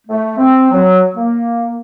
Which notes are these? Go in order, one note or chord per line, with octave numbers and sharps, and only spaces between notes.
A3
C4
F#3
A#3